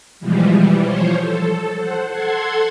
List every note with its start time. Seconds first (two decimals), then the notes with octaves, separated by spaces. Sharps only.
0.20 B2 E3 F3 G3 G#3
0.49 E3 G3
0.84 F3 C5 C#5
1.21 A4
1.78 C5 F#5
2.10 A4 F#5 C6 G#6